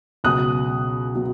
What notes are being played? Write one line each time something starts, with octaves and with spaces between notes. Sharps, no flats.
C#2 B2 F#3 D#6 F#6
B2 F#3